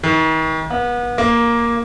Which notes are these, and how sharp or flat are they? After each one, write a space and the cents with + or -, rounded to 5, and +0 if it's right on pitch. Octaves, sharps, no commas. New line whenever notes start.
D#3 +40
B3 -35
A#3 +5